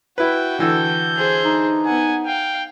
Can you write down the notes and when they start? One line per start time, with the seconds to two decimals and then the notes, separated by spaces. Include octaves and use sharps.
0.18 E4 F#4 B4 G5
0.59 D3 E3 A4 G6
1.16 G#4 C5
1.45 D#4
1.86 B3 F#5 G#5
2.26 F5 G5